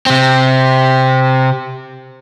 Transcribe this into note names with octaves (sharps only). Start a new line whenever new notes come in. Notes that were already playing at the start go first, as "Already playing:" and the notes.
C3 C4